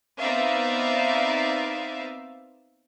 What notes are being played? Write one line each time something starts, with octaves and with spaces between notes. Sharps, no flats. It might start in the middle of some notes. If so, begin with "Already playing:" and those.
B3 C4 D#4 D5 E5 F5